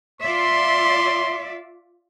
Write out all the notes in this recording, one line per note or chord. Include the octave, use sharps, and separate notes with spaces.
F4 D5 E5 C6